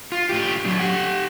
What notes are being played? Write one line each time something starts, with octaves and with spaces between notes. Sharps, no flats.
F4
A2 G4
F#3 D4
G4 F#5